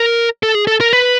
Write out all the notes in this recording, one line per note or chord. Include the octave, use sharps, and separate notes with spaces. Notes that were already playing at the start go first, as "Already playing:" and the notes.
Already playing: A#4
A4
G#4
A4
A#4
B4